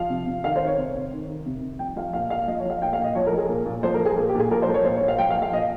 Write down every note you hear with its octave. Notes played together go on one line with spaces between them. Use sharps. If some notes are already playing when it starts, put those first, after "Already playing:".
Already playing: F3 F5
C3
C3
D#3 F5
C5
D#3
C#5
C3
C3
D#3
D#3
C3
C3
F3 G5
F3 F5
A#2 F5
A#2 F5
F3 D#5
C#5
F3 F5
A#2 G5
F5
A#2
D#5
F3 C#5
A#4
F3
G#4
A#2
A#2
F3 C5
A#4
F3
G#4
A#2 G#4
G4
A#2 G#4
F3 A#4
C5
F3
C#5
A#2 C5
C#5
A#2
F5
F3 G5
F5
F3
F5
A#2 D#5